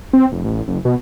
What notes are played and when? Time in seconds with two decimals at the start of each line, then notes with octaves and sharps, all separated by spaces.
0.13 C4
0.32 F1
0.45 A1
0.68 F#1
0.85 B2